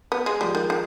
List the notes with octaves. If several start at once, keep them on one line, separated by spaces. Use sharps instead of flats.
B3
G#3
F3 G3 G#3
D#3
D#3